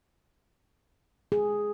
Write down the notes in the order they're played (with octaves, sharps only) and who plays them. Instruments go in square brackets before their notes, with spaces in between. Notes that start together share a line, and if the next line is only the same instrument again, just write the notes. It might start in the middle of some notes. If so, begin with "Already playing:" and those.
[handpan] G#4